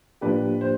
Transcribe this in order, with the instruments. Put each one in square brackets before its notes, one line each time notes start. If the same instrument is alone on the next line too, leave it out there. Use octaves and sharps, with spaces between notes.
[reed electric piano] A2 F3 A#3 D4 G4 [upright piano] B4
[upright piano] C5